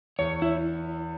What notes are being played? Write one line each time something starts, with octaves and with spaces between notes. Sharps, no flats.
E2 C#5
E4